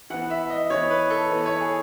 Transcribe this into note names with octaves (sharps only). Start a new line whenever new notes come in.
E3 B3 F#5
E5
D#5
E3 B3 C#5
B4
A4
E3 B3
C#5
G#4